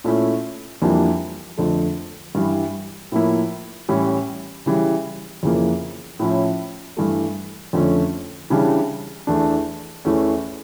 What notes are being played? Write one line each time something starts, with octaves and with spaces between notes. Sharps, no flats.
A#2 A3 C#4 E4
F2 E3 G3 A#3 D4
F2 D3 A3
G2 E3 G3
A2 F3 A#3 E4
A2 E3 G3 C#4 E4
C#3 E3 G3
F2 C#3 E3 A#3
A2 F3 C#4 E4
G2 E3 A3
F2 D3 A3 C#4
C#3 E3 G3 D4
E2 E3 A3 D4
E2 E3 A3 C#4